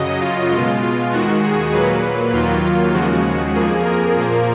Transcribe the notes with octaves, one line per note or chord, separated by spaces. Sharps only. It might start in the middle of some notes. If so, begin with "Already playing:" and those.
Already playing: F#2 C#3 F#3 D#5
F4
B2 G#3 F4
F4
D#2 D#3 G#3 F#4
G#4
A#2 F#3 A#3 B4
D#2 D#3 F#3 A#3 F4
F4
D#2 C#3 F3 G#3 F#4
F2 F3 A#3 G#4
A#4
A#2 F3 A#3